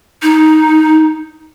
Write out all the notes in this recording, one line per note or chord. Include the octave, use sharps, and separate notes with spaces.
D#4